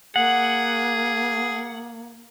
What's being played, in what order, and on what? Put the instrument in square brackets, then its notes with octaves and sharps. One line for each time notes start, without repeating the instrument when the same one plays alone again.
[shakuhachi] A#3 [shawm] G#4 [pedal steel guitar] F#5